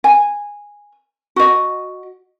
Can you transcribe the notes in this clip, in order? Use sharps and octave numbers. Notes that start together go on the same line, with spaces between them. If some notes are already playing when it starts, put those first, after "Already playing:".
G#5
F#4 D#5